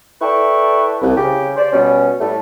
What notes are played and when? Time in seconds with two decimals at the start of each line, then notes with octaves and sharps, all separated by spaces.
0.22 E4 A4 B4 D5 G5 C#6
1.02 C2
1.17 C#3 G4
1.57 C5 D5
1.73 B2 G3 B3 C#4
2.20 A2 G3 A3